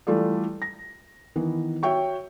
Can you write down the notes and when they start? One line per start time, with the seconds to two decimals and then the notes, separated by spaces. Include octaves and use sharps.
0.07 E3 G3 A3 F4 A4 D5
0.62 A#6
1.36 D#3 E3 B3
1.83 F#4 C#5 E5 G5 C#6